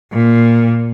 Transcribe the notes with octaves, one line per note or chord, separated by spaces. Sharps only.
A#2